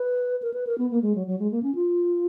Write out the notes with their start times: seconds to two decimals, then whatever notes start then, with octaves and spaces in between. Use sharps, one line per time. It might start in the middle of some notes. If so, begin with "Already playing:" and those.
Already playing: B4
0.42 A#4
0.53 B4
0.67 A#4
0.78 B3
0.91 A#3
1.02 G#3
1.15 F#3
1.27 F#3
1.39 G#3
1.51 A#3
1.63 C#4
1.75 F4